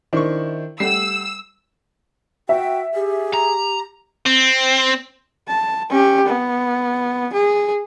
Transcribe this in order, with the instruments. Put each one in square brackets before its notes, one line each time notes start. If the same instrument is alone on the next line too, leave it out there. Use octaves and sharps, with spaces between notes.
[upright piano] D#3 D4 C5 [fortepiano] E4 C#6
[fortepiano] G3 A3 F#5 [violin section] E6 [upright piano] C7
[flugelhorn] F#4 [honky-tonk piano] E5 [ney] G5
[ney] G4 [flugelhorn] G#4
[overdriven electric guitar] A#5
[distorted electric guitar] C4
[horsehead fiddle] A5
C#4 G4
B3
G#4